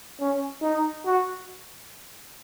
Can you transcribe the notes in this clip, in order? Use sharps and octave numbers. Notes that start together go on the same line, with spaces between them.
C#4
D#4
F#4